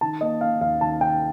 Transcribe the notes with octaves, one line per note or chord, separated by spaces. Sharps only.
D#3 A5
A#3 D#5
A#3 F5
D#2 F5
D#3 A5
D#3 G5